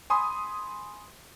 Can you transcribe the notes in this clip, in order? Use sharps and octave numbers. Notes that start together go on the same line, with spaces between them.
G#5 B5 C6 D#6